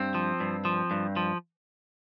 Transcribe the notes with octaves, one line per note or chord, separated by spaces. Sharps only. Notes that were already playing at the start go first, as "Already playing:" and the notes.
Already playing: G2 C4
F3
G2
F3
G2
F3